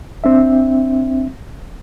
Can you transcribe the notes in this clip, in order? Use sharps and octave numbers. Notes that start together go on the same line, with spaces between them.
C4 D4 E5